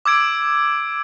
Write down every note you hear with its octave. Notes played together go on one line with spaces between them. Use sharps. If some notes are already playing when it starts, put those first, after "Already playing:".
D6 E6 G#6 D7